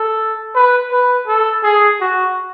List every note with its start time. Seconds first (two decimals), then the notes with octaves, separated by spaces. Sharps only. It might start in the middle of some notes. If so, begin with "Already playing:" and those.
Already playing: A4
0.55 B4
0.91 B4
1.27 A4
1.63 G#4
2.01 F#4